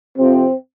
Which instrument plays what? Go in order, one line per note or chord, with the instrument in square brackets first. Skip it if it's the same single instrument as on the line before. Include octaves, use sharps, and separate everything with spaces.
[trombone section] F2 C3 F3 C4